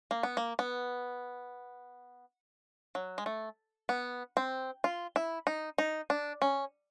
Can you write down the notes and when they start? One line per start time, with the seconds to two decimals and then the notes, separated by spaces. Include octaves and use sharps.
0.11 A#3
0.23 B3
0.37 A#3
0.59 B3
2.95 F#3
3.18 G#3
3.26 A3
3.89 B3
4.37 C4
4.84 F4
5.16 E4
5.47 D#4
5.78 D#4
6.10 D4
6.42 C#4